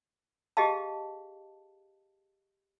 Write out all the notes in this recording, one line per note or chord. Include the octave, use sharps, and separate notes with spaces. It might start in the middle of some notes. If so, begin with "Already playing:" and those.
G4 G#4 D#5 F5 A5